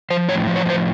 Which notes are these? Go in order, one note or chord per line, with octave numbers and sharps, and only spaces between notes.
F3 C5
A2 C#5
F3
C#5
A2 C5